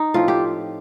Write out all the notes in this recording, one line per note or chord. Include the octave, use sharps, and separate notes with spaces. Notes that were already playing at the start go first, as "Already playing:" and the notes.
Already playing: D#4
A2 F3 C4 F4
G4